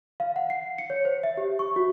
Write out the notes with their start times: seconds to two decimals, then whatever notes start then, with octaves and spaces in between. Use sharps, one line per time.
0.20 F5
0.36 F#5
0.50 C7
0.78 C#7
0.90 C#5
1.05 C5
1.23 E5
1.37 G4
1.59 C#6
1.76 F#4